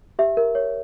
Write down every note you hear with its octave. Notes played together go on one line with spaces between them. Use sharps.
G4 E5
A#4
C#5